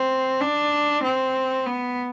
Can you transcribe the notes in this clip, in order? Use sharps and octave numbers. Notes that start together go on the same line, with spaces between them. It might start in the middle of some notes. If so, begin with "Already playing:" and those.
Already playing: C4
D4
C4
B3